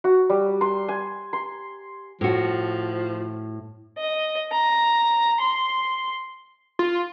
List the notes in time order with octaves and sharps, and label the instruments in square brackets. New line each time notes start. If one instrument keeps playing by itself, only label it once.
[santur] F#4
G3
C6
G#5
C6
[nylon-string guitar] A2 F#4 [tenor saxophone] F3
[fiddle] D#5
A#5
C6
[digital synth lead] F4